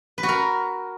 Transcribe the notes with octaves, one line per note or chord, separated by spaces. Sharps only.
B4
F#4
A#4